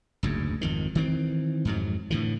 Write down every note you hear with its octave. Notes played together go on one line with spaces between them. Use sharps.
F#1 D2 G#2
G#1 F2 D#3
D#3 E3 C4
F2 G#2 F#3
A2 D3 E3